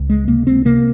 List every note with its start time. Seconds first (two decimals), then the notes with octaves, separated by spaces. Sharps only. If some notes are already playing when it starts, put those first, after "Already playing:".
Already playing: C#2
0.10 G#3
0.28 C3 A#3
0.47 C4
0.65 C3 A#3